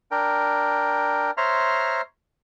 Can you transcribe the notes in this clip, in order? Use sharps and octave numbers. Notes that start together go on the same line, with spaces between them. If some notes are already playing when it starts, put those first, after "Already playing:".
D4 A#4 G5
C5 C#5 E5 A#5 C6 F6